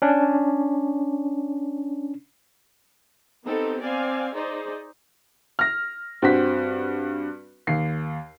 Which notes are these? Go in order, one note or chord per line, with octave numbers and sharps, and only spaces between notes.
C#4 D4
B3 C4 D#4 G4 A4
C4 D5 F5 G#5
D#4 G#4 C5 D5
F6 A#6
G2 C4 F#4 B6
D#2 C7